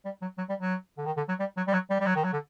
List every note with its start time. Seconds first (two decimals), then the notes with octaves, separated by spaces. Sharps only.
0.05 G3
0.22 F#3
0.38 F#3
0.49 G3
0.61 F#3
0.98 D3
1.06 D#3
1.17 D3
1.29 F#3
1.40 G3
1.57 F#3
1.67 G3
1.73 F#3
1.90 G3
2.00 G3
2.06 F#3
2.16 D#3
2.24 F#3
2.33 D3